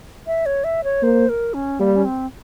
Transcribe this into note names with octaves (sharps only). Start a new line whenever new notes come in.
E5
C#5
E5
C#5
A#3 C5
A#4
C#4
G3 A#3
C#4
C4